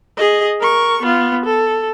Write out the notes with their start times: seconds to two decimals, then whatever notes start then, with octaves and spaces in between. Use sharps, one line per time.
0.17 G#4 D#5
0.61 A#4 C#6
1.03 B3 F4
1.45 A4